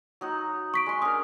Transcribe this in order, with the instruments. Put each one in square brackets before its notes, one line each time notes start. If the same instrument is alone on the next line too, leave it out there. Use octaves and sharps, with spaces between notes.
[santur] F#3 D#4 F#4
[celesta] C#6 B6 D7
[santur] G#3 C6
[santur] C#4 D4 A#4 [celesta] D#6